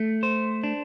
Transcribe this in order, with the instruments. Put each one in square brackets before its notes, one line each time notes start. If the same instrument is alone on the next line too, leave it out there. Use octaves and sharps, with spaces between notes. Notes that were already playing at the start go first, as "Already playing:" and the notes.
Already playing: [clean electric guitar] A3
C5
D4